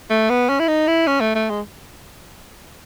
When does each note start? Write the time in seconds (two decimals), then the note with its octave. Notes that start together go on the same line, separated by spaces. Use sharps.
0.10 A3
0.30 B3
0.49 C#4
0.59 E4
0.68 D#4
0.87 E4
1.07 C#4
1.20 A3
1.35 A3
1.50 G#3